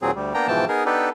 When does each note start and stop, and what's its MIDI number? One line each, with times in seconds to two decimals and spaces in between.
0.02 0.11 39
0.02 0.11 46
0.02 0.11 54
0.02 0.11 60
0.02 0.11 68
0.15 0.33 38
0.15 0.33 55
0.34 0.47 58
0.34 0.47 59
0.34 0.47 62
0.34 0.47 79
0.34 0.47 82
0.48 0.65 44
0.48 0.65 47
0.48 0.65 52
0.48 0.65 53
0.48 0.65 79
0.48 0.65 81
0.68 0.84 59
0.68 0.84 63
0.68 0.84 68
0.68 0.84 70
0.86 1.09 59
0.86 1.09 62
0.86 1.09 63
0.86 1.09 67
0.86 1.09 69
0.86 1.09 71